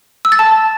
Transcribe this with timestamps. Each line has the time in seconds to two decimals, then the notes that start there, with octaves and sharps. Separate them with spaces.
0.25 E6
0.32 A6
0.39 A5